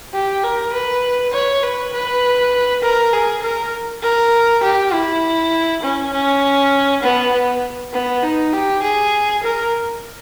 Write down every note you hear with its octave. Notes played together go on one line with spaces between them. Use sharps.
G4
A#4
B4
C#5
B4
B4
A#4
G#4
A#4
A#4
G4
E4
C#4
C#4
B3
B3
B3
D#4
G4
G#4
A#4